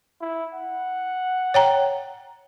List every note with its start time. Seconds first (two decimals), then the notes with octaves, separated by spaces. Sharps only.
0.21 E4
0.54 F#5
1.54 C#5 G5 A#5